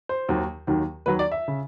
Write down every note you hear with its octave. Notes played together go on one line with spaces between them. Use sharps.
C5
D#2 D#3 F#3
D#2 D#3 F#3
D#2 D#3 F#3 B4
D5
E5
C#3